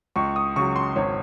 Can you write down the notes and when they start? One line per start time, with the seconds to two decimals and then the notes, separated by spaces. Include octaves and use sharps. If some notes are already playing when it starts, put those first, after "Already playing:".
0.16 C#2 C#6
0.36 D#6
0.56 C#3 F#3 C#6
0.76 C6
0.96 G#1 C#5